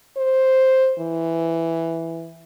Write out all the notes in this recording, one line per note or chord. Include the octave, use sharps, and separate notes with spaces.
C5
E3